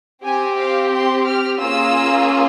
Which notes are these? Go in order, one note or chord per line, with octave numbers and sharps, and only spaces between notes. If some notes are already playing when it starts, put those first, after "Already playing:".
C4 G4 G#5
F5
C6
F6
A#3 C#4 F4 G#4 E6